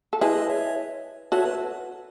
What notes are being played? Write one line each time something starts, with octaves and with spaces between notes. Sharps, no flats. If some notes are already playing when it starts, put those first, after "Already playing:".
A4
E4 G#4 B4 D#5
C#5 E5
F#4 A4 C#5 E5
B4